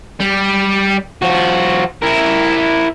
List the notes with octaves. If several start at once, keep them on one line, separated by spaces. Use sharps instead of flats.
G3
F3 F#4
E4 A#4